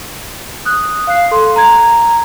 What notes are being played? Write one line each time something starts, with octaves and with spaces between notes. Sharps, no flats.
D#6 F#6
F5 F#6 C7
A4 C6
A#5 G#6